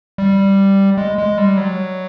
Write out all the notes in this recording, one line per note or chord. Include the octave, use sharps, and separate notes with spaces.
G3
G#3
G#3
G3
F#3